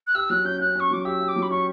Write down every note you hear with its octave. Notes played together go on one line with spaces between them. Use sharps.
F#6
G4 E6
F#3 F#6
C#4 G6
C#4 F#6
C#4 C#6
F#3 D6
G4 E6
G4
D6
F#3
B5
C#4 C#6